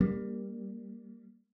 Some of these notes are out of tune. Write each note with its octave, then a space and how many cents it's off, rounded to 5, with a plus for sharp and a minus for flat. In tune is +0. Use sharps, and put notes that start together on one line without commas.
G3 +15 A#3 +0 D4 -35